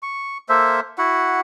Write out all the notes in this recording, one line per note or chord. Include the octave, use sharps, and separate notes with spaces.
C#6
A#3 A4 C5 E5
E4 F#4 F#5